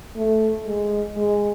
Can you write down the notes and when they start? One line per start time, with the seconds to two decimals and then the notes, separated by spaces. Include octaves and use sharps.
0.16 A3
0.66 G#3
1.17 G#3